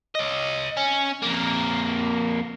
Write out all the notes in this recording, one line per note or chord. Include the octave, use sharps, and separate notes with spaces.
C#5 D#5
C#4
F2 A#3